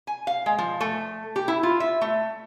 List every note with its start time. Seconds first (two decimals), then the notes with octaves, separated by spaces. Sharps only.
0.07 G#5
0.27 F5
0.46 G#3
0.58 F3
0.81 A3
1.36 G4
1.48 E4
1.63 F4
1.80 E5
2.01 A3